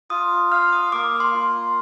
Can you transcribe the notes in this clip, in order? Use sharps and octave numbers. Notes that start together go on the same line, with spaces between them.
F4 D#6
F5 F6
D#6
A#3 D6
C6
F4